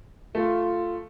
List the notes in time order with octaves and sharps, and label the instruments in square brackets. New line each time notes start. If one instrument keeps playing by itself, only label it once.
[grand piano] A3 [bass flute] F4